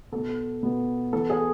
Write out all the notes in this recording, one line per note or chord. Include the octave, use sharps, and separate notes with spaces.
B2 B3 A4
B2 B3
E3 B3 A4
G#4